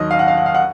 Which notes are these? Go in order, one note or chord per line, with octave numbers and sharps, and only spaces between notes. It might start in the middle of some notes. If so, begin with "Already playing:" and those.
Already playing: D#2 D#3 F#3 D#5
F5
F#5
F5
F#5
F5
F#5